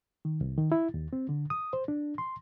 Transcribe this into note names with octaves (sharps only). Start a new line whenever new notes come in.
D#3
C2
D#3
E4
D#2
C4
D3
D#6
C5
D4
C6